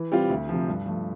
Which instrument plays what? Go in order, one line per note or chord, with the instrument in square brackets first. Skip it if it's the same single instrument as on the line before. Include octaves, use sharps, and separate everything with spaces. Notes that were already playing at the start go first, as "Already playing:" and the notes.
Already playing: [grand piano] E3
G3 C4 F4
D2
C3 F3
G2
F3 A3